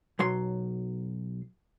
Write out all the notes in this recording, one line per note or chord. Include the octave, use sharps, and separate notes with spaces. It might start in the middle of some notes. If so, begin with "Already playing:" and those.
B1 F#3 C6